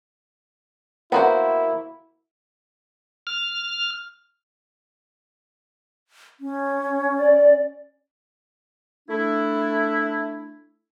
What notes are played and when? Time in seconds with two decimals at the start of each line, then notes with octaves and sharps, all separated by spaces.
1.12 A#3 B3 E4 F#4 C5
3.27 F6
6.40 C#4
7.20 D5
9.09 A3 D4 E4